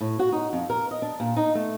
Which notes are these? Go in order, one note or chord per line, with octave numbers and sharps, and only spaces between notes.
A2
F#4
D#4
F2
A#4
D#5
D4
A#2
D#4
A3